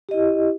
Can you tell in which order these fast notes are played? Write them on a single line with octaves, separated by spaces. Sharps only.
G4 D#5 E4